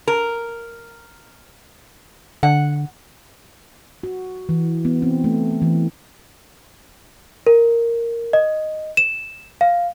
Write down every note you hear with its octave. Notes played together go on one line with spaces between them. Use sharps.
A#4
D3 F#5
F#4
E3
B3
C4
A3
E3
A#4
D#5
E7
F5